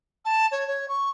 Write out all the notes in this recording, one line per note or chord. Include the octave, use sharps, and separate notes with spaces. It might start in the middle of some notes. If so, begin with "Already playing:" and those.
A5
C#5
C#5
C#6